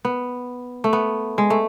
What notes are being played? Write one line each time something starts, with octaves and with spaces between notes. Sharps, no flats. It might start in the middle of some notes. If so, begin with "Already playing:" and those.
B3
A3
B3
G#3
A3